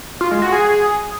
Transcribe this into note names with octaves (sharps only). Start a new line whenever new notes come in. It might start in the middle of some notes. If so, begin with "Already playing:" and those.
F4
G#3
F#4
G#4